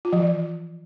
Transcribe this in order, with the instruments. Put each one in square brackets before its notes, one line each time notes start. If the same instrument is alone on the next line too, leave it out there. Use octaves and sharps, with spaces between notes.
[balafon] F4
F3
E3